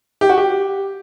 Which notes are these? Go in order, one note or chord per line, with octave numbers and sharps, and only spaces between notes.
G4
F#4
G4